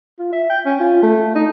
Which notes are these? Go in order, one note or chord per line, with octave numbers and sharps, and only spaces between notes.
F4
E5
G5
C#4
F4
A3
D#4